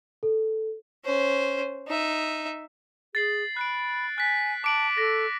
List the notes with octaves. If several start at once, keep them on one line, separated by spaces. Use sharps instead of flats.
A4
C#4 C5
D#4 E5
G#4 A6 C7 F#7
B5 F#6 C7 D7
G#5 F#6 B6
A5 D6 D7 F#7
A4 A#6